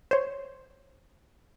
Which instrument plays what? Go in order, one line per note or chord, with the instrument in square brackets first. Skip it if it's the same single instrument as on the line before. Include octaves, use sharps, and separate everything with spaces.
[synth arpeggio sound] C5 C#5